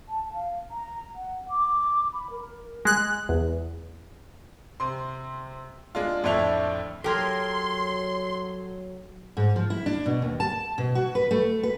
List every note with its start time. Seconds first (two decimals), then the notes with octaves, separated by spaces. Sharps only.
0.08 A5
0.33 F5
0.71 A#5
1.15 F#5
1.49 D6
2.13 B5
2.31 A#4
2.85 G#3 F#6
3.29 E2
4.80 C3 C6
5.95 G#3 D4 F4
6.24 F2 A2 A3 D4 E4 F7
7.04 F#3 G4 A4 A#4 A#5 C6 G#6
9.37 G#2
9.56 F3
9.70 E4
9.86 D4
10.06 B2
10.22 D#2
10.40 A5
10.78 B2
10.95 F#4
11.15 B4
11.31 A3
11.63 B4